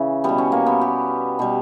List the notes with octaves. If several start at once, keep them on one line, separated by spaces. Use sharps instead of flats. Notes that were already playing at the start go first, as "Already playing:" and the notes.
Already playing: C#3 E3
B2 G3 B3
C#4
A#3
B3
G4
B2 G3